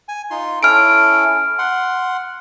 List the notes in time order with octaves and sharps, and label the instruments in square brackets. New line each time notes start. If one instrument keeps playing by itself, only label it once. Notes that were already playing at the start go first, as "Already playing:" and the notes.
[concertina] G#5
D#4 F4 C6
[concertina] C#4 E4 A4 [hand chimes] F6 D7
[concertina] F#5 C6